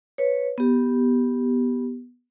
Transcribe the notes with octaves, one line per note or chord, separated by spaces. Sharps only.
B4 C#5
B3 G4